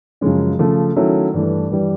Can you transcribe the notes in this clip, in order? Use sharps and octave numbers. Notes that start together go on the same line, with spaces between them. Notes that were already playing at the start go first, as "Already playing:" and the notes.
F#2 C#3 F3 G#3 C#4
C#3 F3 A3
D#3 F#3 A3 C#4 E4
G2 E3 A3
G2 E3 G3